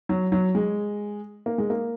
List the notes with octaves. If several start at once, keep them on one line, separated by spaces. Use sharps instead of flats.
F#3
F#3
G#3
A#3
G#3
A#3